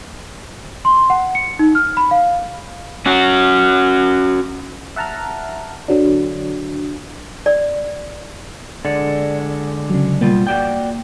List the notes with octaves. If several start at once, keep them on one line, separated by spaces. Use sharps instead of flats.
C6
F#5
C#7
D#4
F6
B5
F5
C#4 F#4
E5 F#5 A5 A#5 F6
D3 F#3 D4
D5
D3 G#3 D5 F#5
C#3 F#3
B2 G3 A#3 F4
F#4 D5 G5